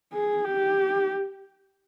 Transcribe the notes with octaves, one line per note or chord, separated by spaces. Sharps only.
G#4
G4